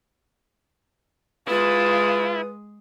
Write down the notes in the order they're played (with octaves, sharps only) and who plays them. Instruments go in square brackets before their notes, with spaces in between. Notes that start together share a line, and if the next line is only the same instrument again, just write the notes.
[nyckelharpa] G#3 D#6 [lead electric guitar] E4 [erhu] F4 [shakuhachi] B4